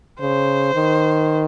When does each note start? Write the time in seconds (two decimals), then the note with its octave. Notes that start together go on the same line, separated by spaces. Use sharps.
0.20 C#3 C5
0.75 D#3